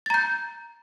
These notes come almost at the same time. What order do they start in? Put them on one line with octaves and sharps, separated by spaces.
A6 A#5 G6